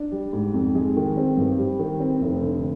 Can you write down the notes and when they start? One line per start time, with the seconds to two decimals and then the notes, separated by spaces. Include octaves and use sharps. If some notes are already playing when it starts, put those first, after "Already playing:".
Already playing: D4
0.12 G3
0.33 G#2
0.54 F2
0.75 G#3
0.96 D#3
1.17 C4
1.37 G2
1.58 G3
1.79 D#3
2.00 C4
2.21 F1
2.42 D3